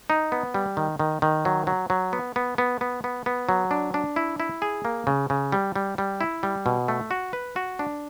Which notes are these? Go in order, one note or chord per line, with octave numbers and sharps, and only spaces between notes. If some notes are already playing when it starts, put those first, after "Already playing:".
D#4
B3
G3
D#3
D#3
D#3
F#3
F#3
F#3
B3
B3
B3
B3
B3
B3
F#3
D4
D4
E4
E4
G#4
A#3
C#3
C#3
G3
G3
G3
E4
G3
B2
A3
F#4
B4
F#4
D4